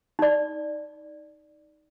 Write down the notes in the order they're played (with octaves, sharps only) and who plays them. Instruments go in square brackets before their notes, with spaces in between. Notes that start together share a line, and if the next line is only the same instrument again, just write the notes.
[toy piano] D#4 D5